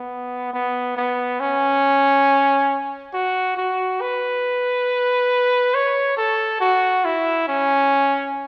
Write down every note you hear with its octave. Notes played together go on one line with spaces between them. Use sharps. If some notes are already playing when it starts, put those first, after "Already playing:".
Already playing: B3
B3
B3
C#4
F#4
F#4
B4
C#5
A4
F#4
E4
C#4